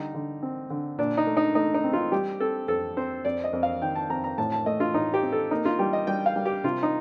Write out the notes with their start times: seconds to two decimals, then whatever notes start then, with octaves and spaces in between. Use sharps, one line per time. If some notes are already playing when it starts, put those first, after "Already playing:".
Already playing: D3 G3 D#4
0.14 D3
0.42 C4
0.70 D3
0.98 A#2 D4
1.17 D#4
1.27 A3
1.37 D#4
1.55 A3 D#4
1.74 D#4
1.84 C4
1.93 F4
2.12 G3 G4
2.40 C4 A4
2.68 F2 A4
2.97 C4 C5
3.25 F2 D5
3.44 D#5
3.53 F2
3.63 F5
3.82 D#3 G5
3.95 A5
4.10 F2 A#5
4.24 A#5
4.38 A2 A5
4.52 A5
4.66 A3 D#5
4.80 F4
4.94 A2 D#4
5.14 G4
5.23 C4
5.32 A4
5.51 A#3 D#4
5.65 F4
5.79 G3 G4
5.93 D#5
6.07 G3 G5
6.26 F5
6.36 G3
6.45 G4
6.64 C3 F4
6.83 D#4